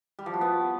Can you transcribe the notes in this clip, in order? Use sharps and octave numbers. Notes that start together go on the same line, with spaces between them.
G3
F3
F#4
B3